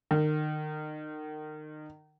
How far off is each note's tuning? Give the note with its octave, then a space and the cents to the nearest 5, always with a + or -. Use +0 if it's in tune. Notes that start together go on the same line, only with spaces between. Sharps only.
D#3 -30